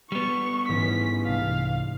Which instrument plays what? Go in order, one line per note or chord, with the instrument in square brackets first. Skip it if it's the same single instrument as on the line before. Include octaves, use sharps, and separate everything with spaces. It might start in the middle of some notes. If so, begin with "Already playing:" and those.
[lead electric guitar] G3 B3 [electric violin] C#6
[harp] A1 G#2 E3 [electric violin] C#4 B6
[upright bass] C2 [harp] D4 [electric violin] F5